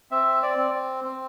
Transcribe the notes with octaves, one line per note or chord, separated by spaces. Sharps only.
C4 E5
D5
C4
C4